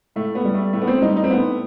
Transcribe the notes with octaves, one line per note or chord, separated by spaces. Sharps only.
A2 A3
B3
G3
A3
A2 A3
B3
C4
G3 D#4
D#4
C4
A2 B3